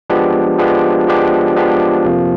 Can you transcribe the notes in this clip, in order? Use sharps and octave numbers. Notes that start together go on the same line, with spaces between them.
F3 G#3 B3 D4 G4
F3 G#3 B3 D4 G4
F3 G#3 B3 D4 G4
F3 G#3 B3 D4 G4
F2 C3 F3 A#3